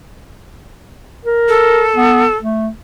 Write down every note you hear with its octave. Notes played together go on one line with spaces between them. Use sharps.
A#4
A4
B3
A3